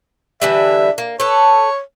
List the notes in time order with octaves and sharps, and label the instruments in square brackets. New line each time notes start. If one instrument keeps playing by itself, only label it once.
[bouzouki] D3 E3 G3 [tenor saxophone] E5
[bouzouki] A#3
[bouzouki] A4 B4 [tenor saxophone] C#5